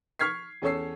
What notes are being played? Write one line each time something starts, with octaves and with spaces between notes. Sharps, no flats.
C#6 F6 G#6 B6 C7
E2 C#4 A4 C#5 E6 C7